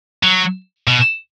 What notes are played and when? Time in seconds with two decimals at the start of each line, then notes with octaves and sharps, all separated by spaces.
0.23 F#3
0.87 B2